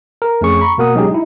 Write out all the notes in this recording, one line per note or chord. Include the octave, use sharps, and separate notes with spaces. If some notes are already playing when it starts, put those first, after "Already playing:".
A#4
F2 A3 C#4 G#4 C#6
A#5 B5 C#6
B2 A#3 A#4 F#5 D#6
F#3 G#3 C#4 D#4 G4 G#4
D#4 E4